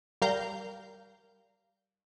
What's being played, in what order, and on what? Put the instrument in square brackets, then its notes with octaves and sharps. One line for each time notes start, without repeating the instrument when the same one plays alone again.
[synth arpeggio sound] G3 A#4 F5 A#5 G6